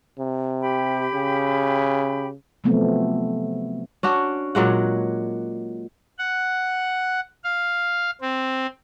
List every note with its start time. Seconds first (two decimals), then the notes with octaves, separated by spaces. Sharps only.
0.19 C3
0.61 G4 G5 B5
1.14 C#3
2.64 C3 F3 F#3 A3 B3 C4
4.03 C#4 D4 F#4
4.55 A#2 F#3 G#3 F#5
6.18 F#5
7.44 F5
8.21 C4